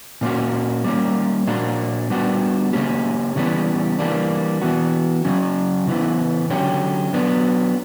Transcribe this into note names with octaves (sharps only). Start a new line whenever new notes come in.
A#2 A#3 C#4 F#4
G3 A#3 C#4
A#2 A#3 D4 F#4
G3 B3 D4 F#4
C#3 E3 A#3 C#4 G4
C#3 E3 G3 B3
E3 G3 A#3 D4
E3 B3 F#4
C#3 F#3 C#4
C#3 E3 B3 E4
D3 F#3 C#4 G4
F#3 B3 D4